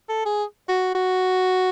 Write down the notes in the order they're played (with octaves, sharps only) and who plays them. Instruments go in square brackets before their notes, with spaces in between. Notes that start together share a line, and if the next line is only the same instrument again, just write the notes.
[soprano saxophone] A4
G#4
F#4
F#4